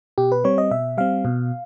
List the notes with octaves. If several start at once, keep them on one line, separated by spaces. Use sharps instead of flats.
B2 G4
B4
G3 C4 C#5
D#5
B2 E5
G3 C4 F5
B2